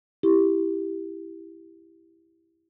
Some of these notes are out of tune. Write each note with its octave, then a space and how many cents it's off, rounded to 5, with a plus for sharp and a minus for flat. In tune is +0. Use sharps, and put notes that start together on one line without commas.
E4 +0 G4 +0